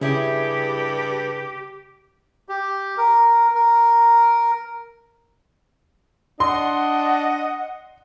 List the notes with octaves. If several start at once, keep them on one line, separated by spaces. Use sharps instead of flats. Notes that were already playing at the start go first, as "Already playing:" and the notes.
G2 C#3 E4 G4 G#4
G4
A#4
A#4
D4 D#5 F#5 C6